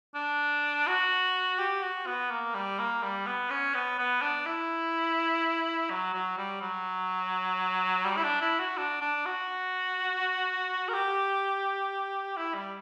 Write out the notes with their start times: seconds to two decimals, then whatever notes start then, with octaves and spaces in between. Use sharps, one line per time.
0.15 D4
0.87 F#4
1.59 G4
1.83 F#4
2.07 B3
2.31 A#3
2.55 G3
2.79 A#3
3.02 G3
3.27 B3
3.51 C#4
3.74 B3
3.99 B3
4.22 D4
4.46 E4
5.90 F#3
6.14 F#3
6.38 G3
6.61 F#3
8.05 G3
8.17 E4
8.24 D4
8.41 E4
8.59 F#4
8.77 D4
9.01 D4
9.26 F#4
10.88 A#4
10.93 G4
12.37 E4
12.55 G3